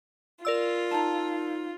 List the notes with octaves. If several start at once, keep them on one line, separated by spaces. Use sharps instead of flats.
F4 A#4 D5 E6
D#4 A5 A#5